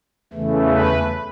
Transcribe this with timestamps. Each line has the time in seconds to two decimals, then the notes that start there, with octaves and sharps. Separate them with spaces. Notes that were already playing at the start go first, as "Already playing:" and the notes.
0.33 E2 C#3 E3 A3
0.68 B4